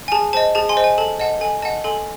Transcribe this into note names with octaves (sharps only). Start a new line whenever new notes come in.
G#5
G#4 A5
C5 D#5 A5
G#4 A5
G#5 C6
C5 D#5
G#5
A4 A5
D#5 F#5 A5
A4 G#5
D#5 F#5 A5
A4 G#5 C6